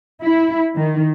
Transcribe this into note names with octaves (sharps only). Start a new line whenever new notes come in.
E4
D#3